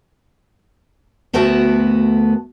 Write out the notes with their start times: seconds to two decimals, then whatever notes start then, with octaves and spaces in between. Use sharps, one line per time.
1.33 D2 A3 B3 F#4 A#4 A5